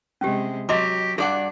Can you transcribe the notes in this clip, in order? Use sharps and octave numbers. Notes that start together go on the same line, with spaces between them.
C3 G#3 C#4 G4
F#3 G4 D#5 C6 D6
G2 D4 G#4 D5 F#5